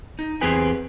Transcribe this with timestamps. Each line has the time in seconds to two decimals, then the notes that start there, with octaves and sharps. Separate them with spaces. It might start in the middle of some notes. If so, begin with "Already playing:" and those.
0.19 D#4
0.41 E2 C4 G4 G#4 B4 G#5